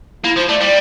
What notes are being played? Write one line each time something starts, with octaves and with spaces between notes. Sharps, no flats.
A#3 E4
F3 C5
A3 D5
G3 D5